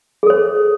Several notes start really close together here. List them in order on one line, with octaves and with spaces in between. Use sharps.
G#4 A4 C5